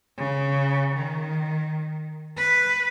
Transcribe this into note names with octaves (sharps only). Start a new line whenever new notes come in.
C#3
D#3
B4